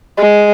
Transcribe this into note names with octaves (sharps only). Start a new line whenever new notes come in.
G#3